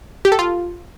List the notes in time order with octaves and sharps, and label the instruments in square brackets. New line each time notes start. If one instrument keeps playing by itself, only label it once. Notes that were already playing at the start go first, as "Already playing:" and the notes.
[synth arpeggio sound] G4
A4
F4